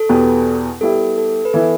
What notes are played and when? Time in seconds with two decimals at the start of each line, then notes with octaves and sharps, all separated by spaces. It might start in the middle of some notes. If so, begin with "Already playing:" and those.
Already playing: A4
0.09 E2 B2 B3 G4 B4
0.81 G3 B3 E4 G4 A4 E5
1.18 A4
1.45 B4
1.53 E3 B3 E4 A4